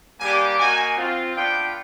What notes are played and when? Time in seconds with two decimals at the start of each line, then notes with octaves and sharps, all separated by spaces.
0.20 G3 A#3 D4 G4 G#5
0.58 A#3 D#4 F#4 G#5
0.97 C4 F4
1.36 B3 D4 F4 G5